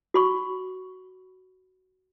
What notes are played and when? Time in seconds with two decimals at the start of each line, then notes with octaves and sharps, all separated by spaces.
0.14 F#4 B5 C#6